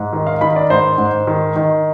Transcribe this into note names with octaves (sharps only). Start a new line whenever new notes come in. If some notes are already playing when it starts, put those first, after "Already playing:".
Already playing: G#2
D#3
F5
D#3 B5
D5
G#2 C5
G#2
D#3
D#3